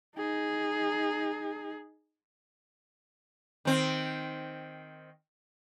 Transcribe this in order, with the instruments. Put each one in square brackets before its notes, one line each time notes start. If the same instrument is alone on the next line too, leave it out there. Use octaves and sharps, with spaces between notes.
[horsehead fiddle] D#4 G#4
[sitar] D#3 C4